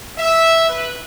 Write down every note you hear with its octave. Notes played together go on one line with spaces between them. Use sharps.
E5
B4